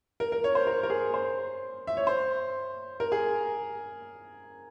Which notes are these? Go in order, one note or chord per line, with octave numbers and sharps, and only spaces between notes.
A#4
A#4
C#5
C5
A#4
A#4
G#4
C5
E5
C#5
C5
A#4
G#4